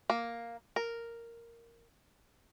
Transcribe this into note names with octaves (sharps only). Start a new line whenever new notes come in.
A#3
A#4